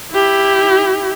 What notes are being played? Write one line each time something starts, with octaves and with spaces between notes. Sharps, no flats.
E4 G4